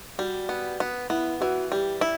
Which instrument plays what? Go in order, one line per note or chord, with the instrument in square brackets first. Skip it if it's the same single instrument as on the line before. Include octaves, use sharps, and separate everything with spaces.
[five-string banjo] G3 [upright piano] F#4
[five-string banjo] B3
B3
[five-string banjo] B3 [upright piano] E4
[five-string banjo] E3 [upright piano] F#4
[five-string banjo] G3 [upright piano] G4
[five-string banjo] E4